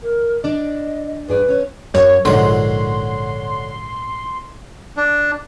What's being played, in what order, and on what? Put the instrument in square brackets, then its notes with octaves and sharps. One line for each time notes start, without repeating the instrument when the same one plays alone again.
[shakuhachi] A#4
[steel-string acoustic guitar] D4 D5 [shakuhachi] D#5
[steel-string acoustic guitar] G2 G#4 D5 [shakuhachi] B4
[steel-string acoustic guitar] C#4 C#5
[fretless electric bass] F#2 [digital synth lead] C#5
[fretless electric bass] A#1 G#2 [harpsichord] D3 F#3 [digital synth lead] C6
[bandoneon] D4